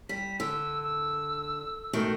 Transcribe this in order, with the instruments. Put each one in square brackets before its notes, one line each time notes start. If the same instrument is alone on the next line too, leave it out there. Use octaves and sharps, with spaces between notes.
[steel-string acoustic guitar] G3 [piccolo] B6
[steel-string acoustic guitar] D3 [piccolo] E6
[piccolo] E6
[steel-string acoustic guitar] B2 D#3 A3